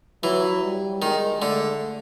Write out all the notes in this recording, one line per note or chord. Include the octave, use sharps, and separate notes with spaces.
E3 F#3
G3
D#3 G#3
D3 A3